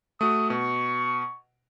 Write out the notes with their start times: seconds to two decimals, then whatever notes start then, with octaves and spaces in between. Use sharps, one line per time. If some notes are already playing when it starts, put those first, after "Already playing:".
0.21 A3 F#4 D#6
0.50 B2 C#6